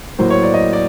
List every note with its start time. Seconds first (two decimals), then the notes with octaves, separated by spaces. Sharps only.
0.19 A2 F#3 A#3 C5
0.30 C#5
0.43 D5
0.54 D#5
0.73 D5